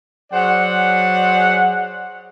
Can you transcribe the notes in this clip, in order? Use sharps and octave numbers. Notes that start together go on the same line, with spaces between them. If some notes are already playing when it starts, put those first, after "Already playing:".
F#3 G#4 C5 D5 F#5